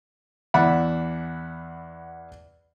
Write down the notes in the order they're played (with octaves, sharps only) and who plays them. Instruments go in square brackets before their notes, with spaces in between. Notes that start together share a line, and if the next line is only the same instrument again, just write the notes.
[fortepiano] E2 D5 E5 F#5 B5